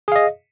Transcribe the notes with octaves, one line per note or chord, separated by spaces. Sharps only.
G#4 D#5 F5